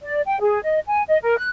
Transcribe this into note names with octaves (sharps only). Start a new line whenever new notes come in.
D5
G5
G#4
D#5
G#5
D#5
A#4
F#6